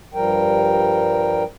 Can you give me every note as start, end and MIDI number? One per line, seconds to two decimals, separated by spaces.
0.14 1.43 43
0.14 1.43 53
0.14 1.43 55
0.14 1.43 70
0.14 1.43 79